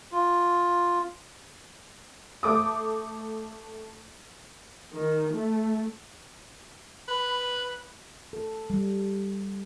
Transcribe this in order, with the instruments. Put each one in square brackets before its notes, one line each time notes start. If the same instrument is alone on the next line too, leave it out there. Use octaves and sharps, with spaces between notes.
[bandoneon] F4
[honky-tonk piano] A3 D6 D#6
[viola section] D#3
A3
[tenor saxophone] B4 [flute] B5
[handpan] A4
G3